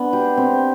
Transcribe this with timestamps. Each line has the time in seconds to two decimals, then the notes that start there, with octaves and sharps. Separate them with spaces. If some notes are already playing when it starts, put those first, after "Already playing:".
Already playing: B3 D4
0.13 G4
0.37 C4